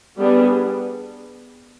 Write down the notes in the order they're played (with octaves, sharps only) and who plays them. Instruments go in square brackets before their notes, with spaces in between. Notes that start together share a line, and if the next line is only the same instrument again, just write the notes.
[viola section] G3 B3 D4 G#4